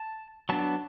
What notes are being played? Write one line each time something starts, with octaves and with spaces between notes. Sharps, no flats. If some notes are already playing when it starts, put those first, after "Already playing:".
Already playing: A5
F#3 B3 D4 A5